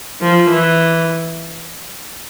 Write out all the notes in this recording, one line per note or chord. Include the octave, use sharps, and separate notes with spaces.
F3
E3